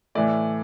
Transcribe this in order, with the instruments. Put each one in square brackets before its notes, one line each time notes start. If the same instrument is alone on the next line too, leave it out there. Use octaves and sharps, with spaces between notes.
[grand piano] A2 E3 A3 D5